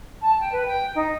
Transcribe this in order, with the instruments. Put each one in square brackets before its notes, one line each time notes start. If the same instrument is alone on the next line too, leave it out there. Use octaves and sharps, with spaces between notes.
[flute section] A5
G5
B4
G5
D#4